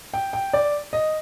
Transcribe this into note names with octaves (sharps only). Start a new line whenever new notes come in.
G5
G5
D5
D#5